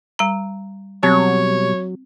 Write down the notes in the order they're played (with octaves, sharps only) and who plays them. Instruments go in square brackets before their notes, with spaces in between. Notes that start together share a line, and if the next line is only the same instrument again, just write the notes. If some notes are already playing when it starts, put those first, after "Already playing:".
[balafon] G3 A#5
[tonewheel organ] B2 G3 [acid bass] F#3 [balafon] C4 [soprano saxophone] C#5